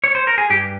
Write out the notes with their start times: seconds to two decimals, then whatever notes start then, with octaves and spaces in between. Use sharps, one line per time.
0.04 C#5
0.15 C5
0.27 A#4
0.38 G#4
0.50 G2 G4